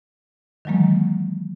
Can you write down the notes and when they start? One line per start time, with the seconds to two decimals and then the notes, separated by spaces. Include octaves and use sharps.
0.65 D#3 E3 F#3 G#3 A#3